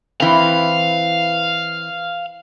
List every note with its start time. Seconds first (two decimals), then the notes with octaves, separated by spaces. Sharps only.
0.20 E3 C4 F5